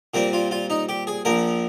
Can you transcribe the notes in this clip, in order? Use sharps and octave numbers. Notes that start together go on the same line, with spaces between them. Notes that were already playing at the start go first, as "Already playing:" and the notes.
A#2 G3 C4 A#4
F4
F4
D#4
G4
G#4
A#1 A#2 F3 A#4